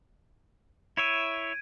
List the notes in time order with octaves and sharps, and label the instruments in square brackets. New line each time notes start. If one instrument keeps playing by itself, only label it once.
[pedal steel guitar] E4 C#5 E5 [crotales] G#6 D7 D#7